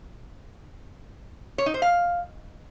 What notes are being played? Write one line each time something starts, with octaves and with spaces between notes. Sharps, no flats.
C#5
D#4
C5
F5